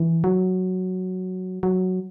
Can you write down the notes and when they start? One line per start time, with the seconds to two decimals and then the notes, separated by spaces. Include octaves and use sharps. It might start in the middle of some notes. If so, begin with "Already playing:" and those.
Already playing: E3
0.24 F#3
1.63 F#3